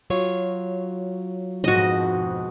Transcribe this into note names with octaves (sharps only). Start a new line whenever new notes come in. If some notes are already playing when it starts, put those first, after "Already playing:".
F#3 F4 C#5
F2 G#2 B2 F#4 D#5